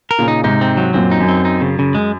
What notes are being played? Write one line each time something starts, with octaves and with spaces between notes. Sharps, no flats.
A#4
A#2 C#3
D#4
G#2 C3 D#4
C4
F#3
F#2 A#2 C4
D#4
F#2
C4
D#4
C#3
C#3
G#3